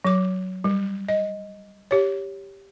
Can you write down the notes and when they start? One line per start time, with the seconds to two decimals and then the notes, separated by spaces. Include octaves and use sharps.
0.05 F#3 D6
0.64 G3
1.08 D#5
1.91 G4 C#5